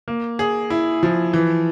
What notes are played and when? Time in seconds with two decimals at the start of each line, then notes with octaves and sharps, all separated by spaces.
0.08 A#3
0.39 G#4
0.70 E4
1.03 F3
1.33 E3